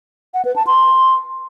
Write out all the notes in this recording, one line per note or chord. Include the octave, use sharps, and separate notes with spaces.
F#5
B4
A5
C6